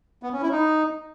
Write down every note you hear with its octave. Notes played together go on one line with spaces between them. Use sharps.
B3
C#4
E4
D#4